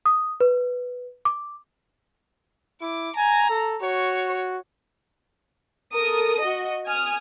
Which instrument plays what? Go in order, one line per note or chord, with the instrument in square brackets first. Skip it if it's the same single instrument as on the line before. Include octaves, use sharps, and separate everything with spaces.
[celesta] D#6
B4
D6
[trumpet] E4 [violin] D6
[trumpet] G#5 [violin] A#5
[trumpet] A4
[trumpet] F#4 [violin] C#5
[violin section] A4 A#4 D#6
F#4 D#5
G#5 D#6 F6